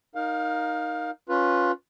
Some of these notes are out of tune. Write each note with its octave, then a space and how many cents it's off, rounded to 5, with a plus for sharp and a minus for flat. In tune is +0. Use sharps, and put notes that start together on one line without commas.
D#4 +0 A#4 +0 F5 +25
C#4 +0 F4 +15 B4 +0